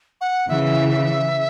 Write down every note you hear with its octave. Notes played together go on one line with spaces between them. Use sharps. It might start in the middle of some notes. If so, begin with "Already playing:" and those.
F#5
C#3 E3 E5